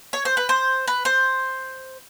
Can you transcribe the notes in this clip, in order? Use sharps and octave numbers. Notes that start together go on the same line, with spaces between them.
C#5
C5
B4
C5
B4
C5